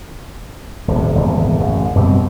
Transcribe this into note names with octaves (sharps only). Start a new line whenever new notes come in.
D#1 A2 C3
D#1 G#1 E2 C#3
A1 F#2 C#3
F#2 B2 G3 C4